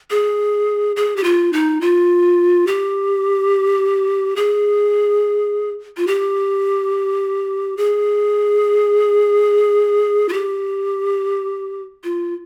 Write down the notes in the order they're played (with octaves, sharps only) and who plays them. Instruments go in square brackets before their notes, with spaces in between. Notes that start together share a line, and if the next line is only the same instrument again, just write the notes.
[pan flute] G#4
G#4
G4
F4
D#4
F4
G4
G#4
F4
G4
G#4
F4
G4
F4